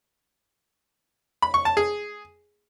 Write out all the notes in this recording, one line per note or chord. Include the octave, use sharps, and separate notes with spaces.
B5
C#6
A5
G#4